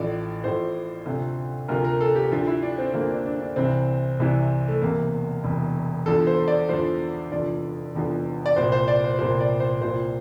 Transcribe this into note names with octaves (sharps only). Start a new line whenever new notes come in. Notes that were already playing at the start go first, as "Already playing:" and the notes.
Already playing: A1 A2 F3 D5
A1 A2 F3 C5
D2 C3 F3
D2 C3 F3 A#4
A#4
A4
G4
D2 D3 F3
E4
D4
C4
D2 D3 F3 A#3
D4
D4
D4
C2 C3 E3 C4
C2 C3 E3
A3
E1 E2 C3 A#3
E1 E2 C3
E2 D3 F3 A4
C5
D5
E2 D3 F3 C5
F1 E2 D3 F3 D5
F1 E2 D3 F3
D5
C2 A#2 F3 C5
C5
D5
C5
C2 A#2 F3 C5
D5
C5
C2 A#2 F3 C5